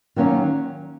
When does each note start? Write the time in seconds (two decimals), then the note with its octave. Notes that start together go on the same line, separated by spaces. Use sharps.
0.16 D#3 F#3 A#3 C#4 F#4